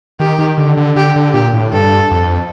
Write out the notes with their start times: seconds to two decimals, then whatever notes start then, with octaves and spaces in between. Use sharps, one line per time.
0.20 D#3 G4
0.39 D#3
0.58 D3
0.77 D3
0.96 D3 G4
1.16 D3
1.34 A#2 G4
1.54 A2
1.72 G2 A4
2.11 F2